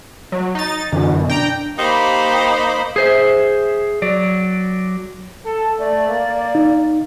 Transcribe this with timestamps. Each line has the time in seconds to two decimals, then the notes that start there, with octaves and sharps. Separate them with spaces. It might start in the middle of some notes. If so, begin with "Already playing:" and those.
0.32 F#3
0.55 D#4 A6
0.92 F#2 B2 D3 E3
1.30 D4 G5 A#5
1.79 A#3 D#4 G4 C5 B5
2.96 G#4 C5 E5
4.02 F#3 D5
5.45 A4
5.79 A3 D5
6.09 A#3
6.55 D#4